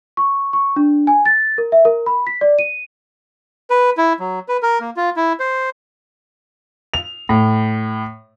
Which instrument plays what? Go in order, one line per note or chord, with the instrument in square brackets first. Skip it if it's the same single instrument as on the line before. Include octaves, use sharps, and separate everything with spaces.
[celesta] C#6
C#6
D4
G#5
A6
A#4
E5
A#4
B5
B6
D5
D#7
[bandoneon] B4
E4
F#3
B4
A#4
A#3
F4
E4
C5
[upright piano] F7
A2